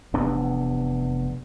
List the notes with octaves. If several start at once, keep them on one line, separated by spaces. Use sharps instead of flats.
F1 E2 B3 D4